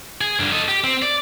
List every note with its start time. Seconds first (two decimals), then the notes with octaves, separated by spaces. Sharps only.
0.21 G#4
0.40 G2 D3
0.52 A4 D#5
0.68 G4
0.84 C4
1.02 D5